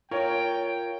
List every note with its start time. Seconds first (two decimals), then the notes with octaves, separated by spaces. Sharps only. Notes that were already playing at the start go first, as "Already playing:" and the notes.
0.11 F4 A#4 C#5 G5